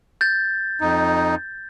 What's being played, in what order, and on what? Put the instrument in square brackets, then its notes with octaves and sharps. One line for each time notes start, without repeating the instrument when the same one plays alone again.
[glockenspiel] G6 A6
[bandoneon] F2 D#4